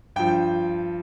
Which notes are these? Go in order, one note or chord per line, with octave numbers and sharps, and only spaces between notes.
G2 F3 G5